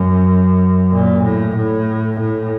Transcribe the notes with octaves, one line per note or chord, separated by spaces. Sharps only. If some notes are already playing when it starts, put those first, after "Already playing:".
Already playing: F#2
A#2
A2
A2
A2